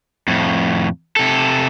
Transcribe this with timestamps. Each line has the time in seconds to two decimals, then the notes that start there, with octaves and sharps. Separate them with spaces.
0.28 F2 A2
1.16 C3 A4